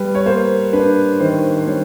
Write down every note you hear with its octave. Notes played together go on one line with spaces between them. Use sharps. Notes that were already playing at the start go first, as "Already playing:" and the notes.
Already playing: G3 B4
C#5
A#3 C5
D4 B4
D#3 C5
C5
G3 C#5